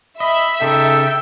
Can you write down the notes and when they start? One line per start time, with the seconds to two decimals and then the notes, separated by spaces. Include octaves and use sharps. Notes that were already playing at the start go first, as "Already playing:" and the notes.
0.20 D#5 E5 B5
0.62 C#3 D#4 A4 G5 E6